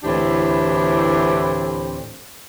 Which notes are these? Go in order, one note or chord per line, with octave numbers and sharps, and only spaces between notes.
D2 A2 E3 C4 D4 G4